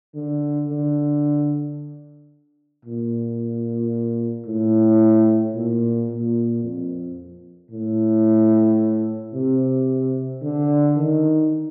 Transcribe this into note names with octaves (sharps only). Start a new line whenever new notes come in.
D3
D3
A#2
A2
A#2
A#2
F2
A2
C3
D3
D#3